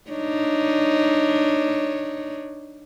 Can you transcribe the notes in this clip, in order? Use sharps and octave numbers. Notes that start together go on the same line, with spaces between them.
D4 D#4 C#5